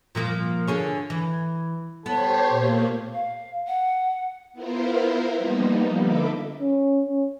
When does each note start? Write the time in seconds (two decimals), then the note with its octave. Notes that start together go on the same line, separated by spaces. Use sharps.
0.15 A#2 F3 A#3
0.67 D3 G#4 C#5
1.10 E3
2.06 B3 G4 A4 C5 C#5
2.49 A#2 A#3
3.13 F5
3.67 F#5
4.53 B3 E4 F4 A#4 C5
5.33 F3 G3 A#3 B3 D#4
6.00 D3 A4 D#5 E5 B5 D6
6.60 C#4
7.06 C#4